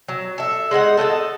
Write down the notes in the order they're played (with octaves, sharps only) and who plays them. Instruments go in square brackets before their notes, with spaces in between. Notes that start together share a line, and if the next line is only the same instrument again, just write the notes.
[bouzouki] F#3
A4 E5
G#3 D#4 F5 F#5
A4 D#5 F#5 A5